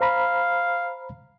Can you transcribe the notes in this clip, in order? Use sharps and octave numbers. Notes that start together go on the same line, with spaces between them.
C5 F5 A#5 B5